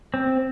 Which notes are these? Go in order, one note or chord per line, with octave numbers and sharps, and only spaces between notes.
C4